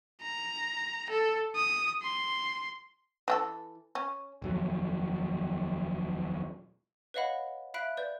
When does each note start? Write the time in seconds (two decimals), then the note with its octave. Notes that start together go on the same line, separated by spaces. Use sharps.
0.22 A#5
1.10 A4
1.55 D#6
2.03 C6
3.28 E3 F4 A4
3.95 C#4
4.42 D#1 F2 F#3
7.14 B4 C#5 D#5 F5 F#5 B5
7.74 E5 F5 B5 F#6 D7
7.97 B4 D5 G6